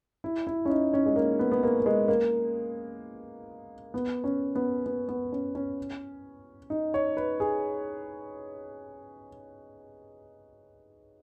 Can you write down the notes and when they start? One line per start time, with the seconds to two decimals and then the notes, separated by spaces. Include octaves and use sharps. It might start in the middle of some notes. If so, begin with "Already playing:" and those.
0.24 E4
0.47 E4
0.65 C#4
0.70 D#4
0.93 C#4
1.06 G#3
1.16 A#3
1.39 B3
1.52 B3
1.63 A#3
1.80 A#3
1.86 G#3
2.08 A#3
3.94 B3
4.24 C#4
4.55 B3
4.86 B3
5.08 B3
5.32 C#4
5.55 C#4
6.70 D#4
6.94 C#5
7.17 B4
7.40 G#4